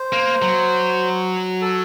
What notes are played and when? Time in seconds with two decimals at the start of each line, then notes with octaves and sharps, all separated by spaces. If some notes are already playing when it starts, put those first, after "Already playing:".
Already playing: C5
0.13 A#3
0.42 F#3
1.61 A4